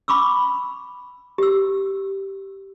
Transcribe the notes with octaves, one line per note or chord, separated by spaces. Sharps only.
B5 C#6 D6 E6
G4 E6